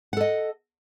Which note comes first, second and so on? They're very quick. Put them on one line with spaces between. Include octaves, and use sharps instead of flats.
F#5 A4 D#5